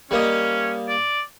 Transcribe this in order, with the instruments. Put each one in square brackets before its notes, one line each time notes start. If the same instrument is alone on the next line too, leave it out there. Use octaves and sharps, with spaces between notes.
[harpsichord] G3 A#3 D#5 [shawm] C#4
[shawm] D5